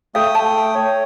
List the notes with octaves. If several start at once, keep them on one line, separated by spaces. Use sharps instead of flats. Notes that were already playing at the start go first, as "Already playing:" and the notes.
A3 A4 F5 G5 D#6
A5
C#5